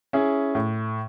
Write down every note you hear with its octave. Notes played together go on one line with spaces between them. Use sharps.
C#4 E4 G#4
A2